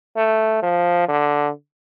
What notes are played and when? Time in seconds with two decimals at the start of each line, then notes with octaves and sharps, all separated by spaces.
0.16 A3
0.63 F3
1.08 D3